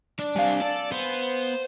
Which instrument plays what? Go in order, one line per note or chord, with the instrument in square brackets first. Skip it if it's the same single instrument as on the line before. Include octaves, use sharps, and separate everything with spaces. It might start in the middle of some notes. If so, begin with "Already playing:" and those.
[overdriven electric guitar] D4 D5
[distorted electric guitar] G3 C4 [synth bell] F5 G#5
[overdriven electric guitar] A4 [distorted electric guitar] D5
[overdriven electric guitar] B3 [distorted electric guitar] C5